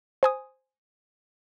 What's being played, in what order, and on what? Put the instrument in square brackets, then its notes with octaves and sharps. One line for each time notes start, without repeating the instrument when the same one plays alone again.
[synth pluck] C5 G#5 D#6